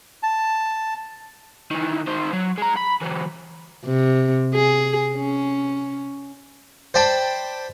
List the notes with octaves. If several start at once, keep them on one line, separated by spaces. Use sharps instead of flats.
A5
D#3 E3
D#3 C5
F#3
G#3 A#5
B5
E3 F#3
C3
G#4
C#4
C5 D5 G5 A5 B5